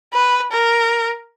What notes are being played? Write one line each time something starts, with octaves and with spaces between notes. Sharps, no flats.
B4
A#4